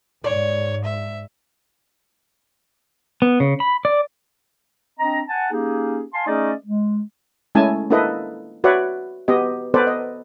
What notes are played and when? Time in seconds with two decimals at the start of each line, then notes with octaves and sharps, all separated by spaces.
0.24 G#2 C#5 D5
0.84 E5
3.22 B3
3.40 C#3
3.60 B5
3.85 D5
4.99 C4 D4 D#5 A#5
5.29 F#5 G#5 A5
5.52 A#3 C#4 D#4 G4 G#4
6.13 F5 G#5 A5 C6
6.27 A3 C#4 D#4 G#4 D5 D#5
6.65 G#3
7.55 G#3 A3 C#4 E4 G#5 A5
7.90 A#3 D4 E4 A4 B4 D#5
8.64 F#4 B4 C#5 D5 E5 F#5
9.28 B3 G4 D#5
9.74 B3 A4 B4 C5 D5
9.87 D#5